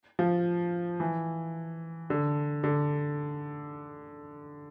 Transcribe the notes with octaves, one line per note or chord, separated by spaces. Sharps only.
F3
E3
D3
D3